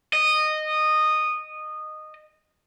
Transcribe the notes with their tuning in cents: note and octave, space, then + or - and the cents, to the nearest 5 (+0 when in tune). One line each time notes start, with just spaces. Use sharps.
D#5 -15